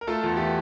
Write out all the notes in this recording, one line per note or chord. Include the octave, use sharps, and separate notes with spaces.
A#4
A3 F4 A4
E2 F4
E3 G4